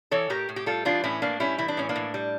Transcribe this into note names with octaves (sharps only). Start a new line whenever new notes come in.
E3 A4 C#5
A2 G4 A#4
A2
G4
G3 F4 A4
E3 D4 F4
A2 C#4 E4
A2 A#3 D4
G3 C#4 E4
E3 E4
D4
A2 C#4
A#3 D4
A2
G3